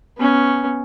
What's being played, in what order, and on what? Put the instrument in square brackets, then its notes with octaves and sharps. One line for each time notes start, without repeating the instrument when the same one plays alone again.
[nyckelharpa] B3 C#4